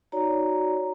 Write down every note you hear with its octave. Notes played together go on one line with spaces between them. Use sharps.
D#4 F#4 C#5 D5 A#5